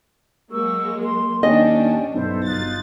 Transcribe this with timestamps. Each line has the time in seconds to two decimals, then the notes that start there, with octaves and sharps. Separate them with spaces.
0.51 F#3 G#3 A#3 C#6 E6
1.02 C6
1.43 D#2 C#4 D4 D5 D#5 G5 G#5
2.14 B1 G2 B2 E4 A4 C5
2.46 G1 D#4 F4 F#6 A6